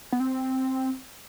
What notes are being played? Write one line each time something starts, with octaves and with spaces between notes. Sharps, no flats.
B3
C4